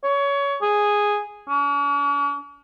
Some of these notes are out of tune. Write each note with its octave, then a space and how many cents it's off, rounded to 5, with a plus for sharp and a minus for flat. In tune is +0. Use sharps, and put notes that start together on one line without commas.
C#5 +25
G#4 -5
C#4 +45